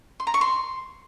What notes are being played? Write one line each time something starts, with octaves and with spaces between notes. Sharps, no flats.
C6
A#5
C#6
C6